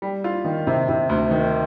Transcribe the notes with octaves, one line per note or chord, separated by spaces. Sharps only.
G3
F4
D#3
C3
C3
D2
D#3